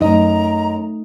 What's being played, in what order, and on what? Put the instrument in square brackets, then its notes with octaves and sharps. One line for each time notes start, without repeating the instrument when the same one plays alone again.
[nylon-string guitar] F#2 D#5 [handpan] A3 D#4 [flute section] A#5